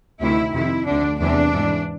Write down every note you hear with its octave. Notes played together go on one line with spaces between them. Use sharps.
D2 C3 D#3 E4
F2 C3 D#3 E4
D2 D3 D4
E2 C3 E3 D4
G#2 E3